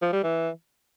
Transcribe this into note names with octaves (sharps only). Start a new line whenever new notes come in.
F3
G3
E3